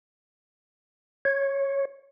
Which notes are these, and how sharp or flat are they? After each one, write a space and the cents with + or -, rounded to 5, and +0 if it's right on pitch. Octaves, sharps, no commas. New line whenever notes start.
C#5 -10